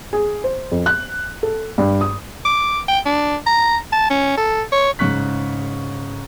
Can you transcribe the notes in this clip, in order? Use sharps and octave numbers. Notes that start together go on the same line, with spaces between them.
G#4
C5
F2
F#6
A4
G2
D#6
D6
G5
D4
A#5
A5
C#4
A4
C#5
G#2 C#3 C#6 F#6 B6